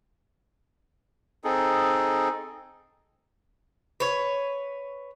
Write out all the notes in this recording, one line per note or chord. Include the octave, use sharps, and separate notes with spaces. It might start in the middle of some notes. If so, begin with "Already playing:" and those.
C4 D#4 G#4 A4
B4 C#5